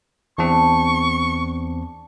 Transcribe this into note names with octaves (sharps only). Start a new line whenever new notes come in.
E2 C4 D4 C#6